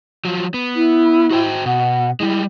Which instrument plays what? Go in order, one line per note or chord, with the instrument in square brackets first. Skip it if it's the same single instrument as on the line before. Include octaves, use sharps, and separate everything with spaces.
[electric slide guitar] F3 F#3
B3
[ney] E4
[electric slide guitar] F#4 C5 G5
[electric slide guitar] B2 [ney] F#5
[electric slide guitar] G3 G#3 [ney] E4